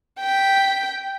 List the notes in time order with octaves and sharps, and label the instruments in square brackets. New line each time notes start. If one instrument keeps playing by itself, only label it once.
[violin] G5 B6